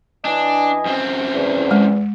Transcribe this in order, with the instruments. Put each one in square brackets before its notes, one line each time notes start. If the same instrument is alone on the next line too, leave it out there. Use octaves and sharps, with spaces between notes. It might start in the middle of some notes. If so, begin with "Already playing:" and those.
[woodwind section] E3 D#5 G#5 [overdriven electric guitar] D4
[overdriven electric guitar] F#2 C4
[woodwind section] E2
[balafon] G#3